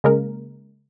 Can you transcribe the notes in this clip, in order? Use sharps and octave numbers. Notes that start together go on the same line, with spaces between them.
C#3 G#3 A#3 A#4